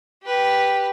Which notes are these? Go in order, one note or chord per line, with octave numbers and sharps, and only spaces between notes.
G4 B4